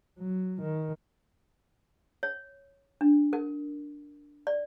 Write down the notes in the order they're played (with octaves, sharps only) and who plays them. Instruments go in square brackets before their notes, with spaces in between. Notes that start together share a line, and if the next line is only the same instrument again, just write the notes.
[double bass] F#3
D#3
[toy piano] C#5
D4
A#4
D5